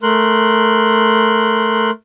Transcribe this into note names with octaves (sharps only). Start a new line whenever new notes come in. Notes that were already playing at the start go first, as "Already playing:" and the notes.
A3 A#4 C6 F#6